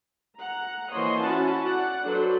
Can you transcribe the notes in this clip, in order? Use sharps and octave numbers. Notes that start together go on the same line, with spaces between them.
F#5 A#5
E3 A#3 C5 C#5 D#5 C6
C#4 E4 F#4 F#5 A5
D5 F#5
F#3 D4 A4 B4 C5